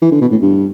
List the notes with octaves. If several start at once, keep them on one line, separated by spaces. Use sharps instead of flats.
E3
D3
B2
A2
G2